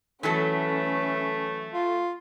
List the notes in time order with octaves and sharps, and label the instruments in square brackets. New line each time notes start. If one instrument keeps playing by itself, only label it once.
[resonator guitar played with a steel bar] E3 F#3 A4 [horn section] A3 [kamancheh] C#4 B4
[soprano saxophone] F4